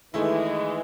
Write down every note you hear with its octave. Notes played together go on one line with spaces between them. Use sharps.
D#3 E3 G#3 A3 E4